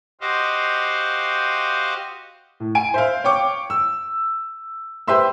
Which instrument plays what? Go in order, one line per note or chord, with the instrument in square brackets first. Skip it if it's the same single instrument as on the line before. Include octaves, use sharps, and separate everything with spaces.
[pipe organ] F#4 G4 C5 D#5 F5
[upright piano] A2
G#5 D7
C5 E5 F5
C#5 F5 G5 C#6 D6
E6
G4 B4 C5 E5 C6 E6